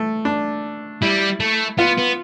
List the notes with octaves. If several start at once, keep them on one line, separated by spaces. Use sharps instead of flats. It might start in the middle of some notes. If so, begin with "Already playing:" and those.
Already playing: A3
D4
G3 E4
A3
B3 F4
B3